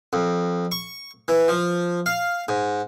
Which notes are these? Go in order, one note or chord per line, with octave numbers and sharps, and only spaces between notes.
F2
C#6
E3
F3
F5
G#2